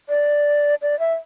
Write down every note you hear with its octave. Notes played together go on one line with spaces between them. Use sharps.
D5
D5
E5